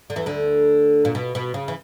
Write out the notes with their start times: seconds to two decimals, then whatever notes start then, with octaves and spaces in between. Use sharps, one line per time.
0.10 D3
0.16 E2 E3
0.26 D2 D3
1.05 A#2
1.15 B2
1.35 B2
1.54 C#3
1.68 E3